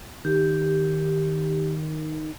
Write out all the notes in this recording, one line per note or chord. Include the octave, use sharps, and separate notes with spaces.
D#3 G4